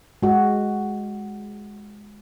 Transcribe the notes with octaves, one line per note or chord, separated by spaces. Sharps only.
G#3 F#4